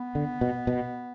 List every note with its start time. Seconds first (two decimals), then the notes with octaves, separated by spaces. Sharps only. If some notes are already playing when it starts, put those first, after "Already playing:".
Already playing: B3
0.15 D3
0.41 B2
0.67 B2